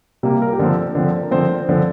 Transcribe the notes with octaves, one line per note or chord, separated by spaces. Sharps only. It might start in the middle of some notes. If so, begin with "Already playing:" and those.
C3 G3 A#3
A#4
G4
D3 F3 C4 A4
D3 F3 C4
A#4
D3 F3 C4 C5
D3 F3 C4